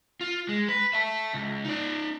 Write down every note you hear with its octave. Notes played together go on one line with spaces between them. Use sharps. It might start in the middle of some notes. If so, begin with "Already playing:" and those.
F4
G#3
B4
E5 A5
C#2
D#4 D5